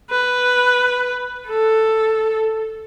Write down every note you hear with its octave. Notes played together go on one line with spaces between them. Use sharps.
B4
A4